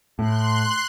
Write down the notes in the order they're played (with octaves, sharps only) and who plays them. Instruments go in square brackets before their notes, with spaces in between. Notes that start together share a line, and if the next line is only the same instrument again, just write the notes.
[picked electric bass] A2 [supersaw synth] C6 F#6